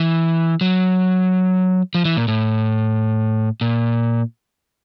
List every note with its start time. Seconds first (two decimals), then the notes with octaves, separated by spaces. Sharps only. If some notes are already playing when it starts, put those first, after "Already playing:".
Already playing: E3
0.61 F#3
1.95 F3
2.05 E3
2.17 A#2
2.28 A2
3.61 A#2